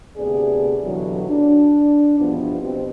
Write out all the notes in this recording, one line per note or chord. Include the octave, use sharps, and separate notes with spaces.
D2 C3 B3 G#4 D5
G2 B2 D3 E3 F#3
D4
E2 G2 B2 F3 B3
B2 C4 G4